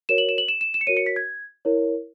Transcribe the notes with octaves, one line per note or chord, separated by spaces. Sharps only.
F#4 A#4 C#5 E7
F#7
E7
F#7
E7
E7
E7
C#7
F#4 A#4 C#5 D#7
C#7
B6
G#6
E4 A#4 C#5